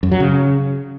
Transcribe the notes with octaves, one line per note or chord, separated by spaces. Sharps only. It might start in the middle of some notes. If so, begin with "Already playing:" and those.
F#2
F#3
C#3